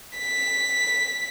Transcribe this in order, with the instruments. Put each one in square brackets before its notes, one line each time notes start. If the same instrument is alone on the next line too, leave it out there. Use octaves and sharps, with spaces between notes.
[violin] B6